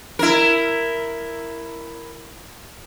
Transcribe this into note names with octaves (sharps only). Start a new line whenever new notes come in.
E4 A#4